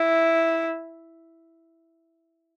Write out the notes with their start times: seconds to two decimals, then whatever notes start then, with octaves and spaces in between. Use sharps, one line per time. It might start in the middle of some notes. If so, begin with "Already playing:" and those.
Already playing: E4